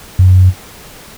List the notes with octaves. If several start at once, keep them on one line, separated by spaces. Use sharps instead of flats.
F#2